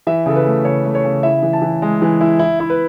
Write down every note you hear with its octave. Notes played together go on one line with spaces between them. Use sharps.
E3 E5
C#3 A4
B4
A3
C#3 C#5
A3
C#5
C#3
E4 E5
E3
A5
E3
G#3
E3
E4
E4
E4
B4